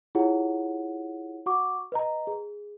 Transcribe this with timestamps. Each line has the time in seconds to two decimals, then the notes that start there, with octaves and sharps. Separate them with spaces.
0.15 E4 F4 G4 G#4 C#5 F#5
1.46 F#4 F#5 C#6 D6
1.92 B4 D#5 A#5
2.27 G#4